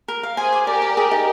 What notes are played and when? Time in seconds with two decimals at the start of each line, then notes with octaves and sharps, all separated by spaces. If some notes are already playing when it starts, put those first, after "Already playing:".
0.08 A#4
0.23 F5
0.37 G#4 C5 G#5
0.52 D6
0.67 G4 A#4 D5
0.82 D5
0.97 G#4
1.11 D#4